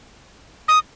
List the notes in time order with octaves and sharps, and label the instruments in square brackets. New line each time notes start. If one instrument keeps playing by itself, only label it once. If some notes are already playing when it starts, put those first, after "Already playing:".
[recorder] D#6